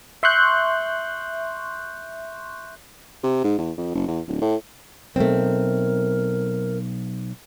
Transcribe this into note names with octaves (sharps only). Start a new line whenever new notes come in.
E5 C6 C#6 F#6 G6
C3
G#2
E2
F2
F#1
E2
D1
A2
B1 A3 C4 A#4